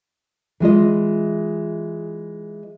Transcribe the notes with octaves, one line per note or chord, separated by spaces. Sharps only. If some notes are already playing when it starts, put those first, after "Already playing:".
E3 G#3 F4 D#5